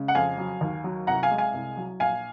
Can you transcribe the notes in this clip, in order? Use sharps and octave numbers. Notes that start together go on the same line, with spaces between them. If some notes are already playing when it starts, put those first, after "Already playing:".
Already playing: C#3 G#3
F#5
F2 F5 G#5
F#3
D#2
F#3
C2 F#5 A#5
F5 G#5
G#3
F5 G#5
C2
F#3
A#1 F5 G#5